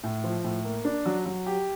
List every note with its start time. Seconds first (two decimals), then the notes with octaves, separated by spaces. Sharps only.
0.03 A2
0.24 F3
0.44 A2
0.64 A#3
0.85 D4
1.06 F#3
1.26 F#3
1.47 G4